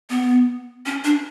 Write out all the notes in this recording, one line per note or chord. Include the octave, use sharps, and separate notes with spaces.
B3
C#4
D4